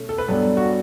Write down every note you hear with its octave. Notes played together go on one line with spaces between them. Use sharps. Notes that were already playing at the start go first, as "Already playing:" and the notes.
Already playing: B2 A3 C#4
A4
B4
G2 F#3 B3 D4 A4
F#4